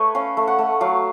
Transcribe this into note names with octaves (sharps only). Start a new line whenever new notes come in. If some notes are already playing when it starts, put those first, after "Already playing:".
Already playing: A3 B4 C#5
C#4 F5
A3
F#5
A3
F#3 F5